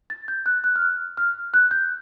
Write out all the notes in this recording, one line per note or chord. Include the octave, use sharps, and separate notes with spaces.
A6
G6
F#6
F#6
F6
F#6
F6
F#6
G6